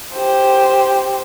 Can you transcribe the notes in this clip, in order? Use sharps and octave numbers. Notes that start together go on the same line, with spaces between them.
G4 C5